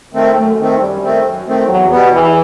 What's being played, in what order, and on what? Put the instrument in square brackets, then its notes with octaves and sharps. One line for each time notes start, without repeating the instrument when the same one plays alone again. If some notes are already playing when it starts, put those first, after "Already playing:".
[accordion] D#3 A3 C4
[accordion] F#2 [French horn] A3
[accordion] D#3 A3 C4
[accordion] F#2 [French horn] G3
[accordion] D#3 A3 C4
F#2
D#3 A3 C4
[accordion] E2 [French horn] F#3
[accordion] B2 G3 B3
[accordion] E2 [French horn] E3